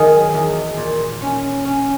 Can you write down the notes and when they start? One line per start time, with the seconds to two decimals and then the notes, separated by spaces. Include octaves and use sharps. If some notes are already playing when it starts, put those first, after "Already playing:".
Already playing: D#3 F#3 G#4 A#4 D#5
0.34 E2
0.77 A#2
1.22 C#4
1.65 C#4